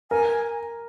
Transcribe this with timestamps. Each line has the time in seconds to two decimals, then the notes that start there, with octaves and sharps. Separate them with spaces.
0.10 A#4 G#5